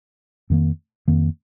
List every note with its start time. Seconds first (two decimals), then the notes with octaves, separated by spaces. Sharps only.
0.50 F2 D#3 A#3
1.08 F2 D#3 A#3